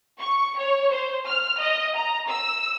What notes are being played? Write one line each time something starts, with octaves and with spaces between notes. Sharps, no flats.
C#6
C#5
C5
F6
D#5
A#5
E6